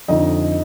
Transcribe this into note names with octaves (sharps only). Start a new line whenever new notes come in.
F2 D3 D#4 D#5